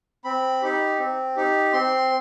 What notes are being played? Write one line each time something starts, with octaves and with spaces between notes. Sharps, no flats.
C4 B5
D#4 G4
C4
D#4 G4
C4 C6